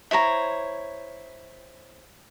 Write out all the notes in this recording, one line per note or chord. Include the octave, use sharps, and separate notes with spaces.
E4 C5 C#5 A#5